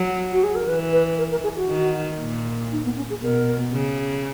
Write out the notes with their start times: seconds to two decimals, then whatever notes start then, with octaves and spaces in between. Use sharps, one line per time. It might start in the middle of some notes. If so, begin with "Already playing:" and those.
Already playing: F#3
0.31 F#4
0.43 G#4
0.55 A#4
0.67 E3 B4
0.92 B4
1.18 A#4
1.30 A#4
1.43 G#4
1.56 F#4
1.68 D#3
2.19 A#2
2.71 D#4
2.84 B3
2.96 C#4
3.09 G#4
3.22 B2 A#4
3.72 C#3